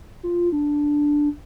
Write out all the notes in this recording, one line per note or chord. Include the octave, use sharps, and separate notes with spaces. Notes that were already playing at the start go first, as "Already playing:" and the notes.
F4
D4